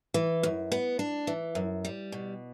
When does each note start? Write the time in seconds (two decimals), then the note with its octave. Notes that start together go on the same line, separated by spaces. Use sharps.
0.14 E3
0.43 F#2
0.72 B3
0.99 D4
1.27 E3
1.55 F#2
1.85 G3
2.12 B2